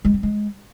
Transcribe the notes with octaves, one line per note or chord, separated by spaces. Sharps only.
G#3
C4
G#3